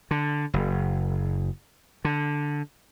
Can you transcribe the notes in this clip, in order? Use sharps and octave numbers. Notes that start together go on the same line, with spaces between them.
D3
F#1
D3